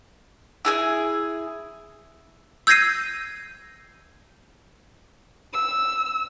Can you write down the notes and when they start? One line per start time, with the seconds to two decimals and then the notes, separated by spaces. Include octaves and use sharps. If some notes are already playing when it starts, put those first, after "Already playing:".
0.65 E4 G#4 G#5
2.67 E6 G6 G#6 A#6 C7 D#7
5.53 E6